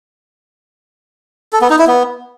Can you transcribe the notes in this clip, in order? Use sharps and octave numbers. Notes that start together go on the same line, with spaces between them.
A4
B3
D#4
E4
B3